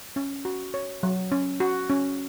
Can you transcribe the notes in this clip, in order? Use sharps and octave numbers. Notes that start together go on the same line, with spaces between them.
C#4
F#4
C#5
F#3
C#4
F#4
C#4